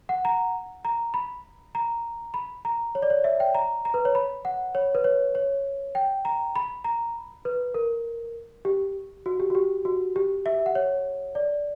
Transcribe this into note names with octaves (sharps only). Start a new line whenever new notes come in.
F#5
A#5
A#5
B5
A#5
B5
A#5
C#5
D5
C#5
E5
G5
A#5
A#5
B4
C#5
B5
F#5
C#5
B4
C#5
C#5
G5
A#5
B5
A#5
B4
A#4
G4
F#4
G4
F#4
G4
F#4
G4
E5
F#5
C#5
D5